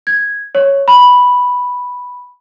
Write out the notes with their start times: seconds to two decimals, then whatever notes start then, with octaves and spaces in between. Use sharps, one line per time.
0.07 G#6
0.55 C#5
0.88 B5